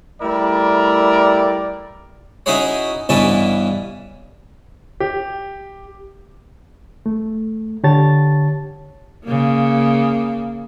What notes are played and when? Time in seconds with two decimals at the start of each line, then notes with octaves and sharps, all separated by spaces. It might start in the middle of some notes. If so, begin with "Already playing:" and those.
0.21 G3 A3 E4 A#4 D5
2.46 C#4 D#4 E4 F#4 G#4 C#5
3.09 G2 B2 E3 C#4 E4 A5
5.00 G4
7.06 A3
7.84 D3 G4 C#5 A5 A6
9.25 C#3 A#3